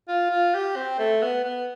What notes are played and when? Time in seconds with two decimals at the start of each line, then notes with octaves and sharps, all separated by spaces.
0.08 F4
0.30 F4
0.54 G4
0.76 C4
0.99 A3
1.22 B3
1.44 B3